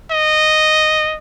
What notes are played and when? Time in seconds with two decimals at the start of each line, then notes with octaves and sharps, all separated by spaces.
0.11 D#5